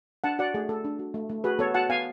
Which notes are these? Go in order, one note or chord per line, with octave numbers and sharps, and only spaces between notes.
D4 F#5 A5
F#4 D5 F#5
A3 G#4
A3 A4
D4
F#4
A3
A3
F#4 G#4 B4
B3 A4 C#5
F#4 F#5 A5
B3 F5 G#5